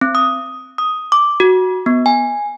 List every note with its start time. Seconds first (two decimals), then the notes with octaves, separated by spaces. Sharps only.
0.01 C4
0.15 D#6
0.78 D#6
1.12 D6
1.40 F#4
1.86 B3
2.06 G#5